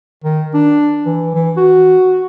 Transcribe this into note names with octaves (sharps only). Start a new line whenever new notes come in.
D#3
D4
E3
E3
F#4